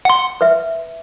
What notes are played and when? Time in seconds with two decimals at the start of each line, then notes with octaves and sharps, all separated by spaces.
0.05 F#5 C6
0.41 B4 E5